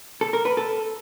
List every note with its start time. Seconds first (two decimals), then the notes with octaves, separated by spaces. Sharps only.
0.21 A4
0.33 A#4
0.45 B4
0.57 A4